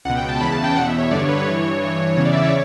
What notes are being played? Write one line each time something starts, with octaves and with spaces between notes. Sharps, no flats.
C#2 B2 F#5
G5
A5
E2 C#3 E3 B5
A5
G5
E2 B2 F#5
E5
C#5
G2 D3 D5
C#5
B4
C#5
G2 E3
G2 E3
E2 C#3 E3 C#5
D5
E5
C#5